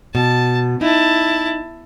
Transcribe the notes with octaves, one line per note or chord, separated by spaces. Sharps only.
B2 A5
D#4 E4 A5